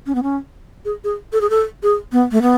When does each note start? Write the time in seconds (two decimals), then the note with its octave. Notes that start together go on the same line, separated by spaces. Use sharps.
0.06 C#4
0.15 B3
0.23 C#4
0.85 G#4
1.04 G#4
1.33 A4
1.41 G#4
1.50 A4
1.83 G#4
2.12 B3
2.32 A3
2.42 B3